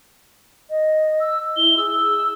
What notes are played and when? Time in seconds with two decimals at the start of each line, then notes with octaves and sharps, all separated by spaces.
0.70 D#5
1.20 E6
1.57 E4 G7
1.77 G#4 E6